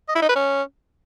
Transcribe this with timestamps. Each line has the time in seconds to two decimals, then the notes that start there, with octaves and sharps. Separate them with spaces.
0.09 D#5
0.15 E4
0.22 D#4
0.29 B4
0.36 C#4